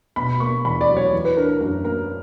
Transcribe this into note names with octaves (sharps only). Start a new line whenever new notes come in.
B2 B5
A#3 C#6
E2 B5
D5
F#3
C#5
E3
B4
D4 A#4
A#4
F#2 A#4
A#3 A#4